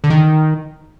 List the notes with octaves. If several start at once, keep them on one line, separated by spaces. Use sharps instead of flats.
D3
D#3